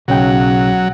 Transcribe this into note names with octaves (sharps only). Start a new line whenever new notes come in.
B1 C#3 F#3 G5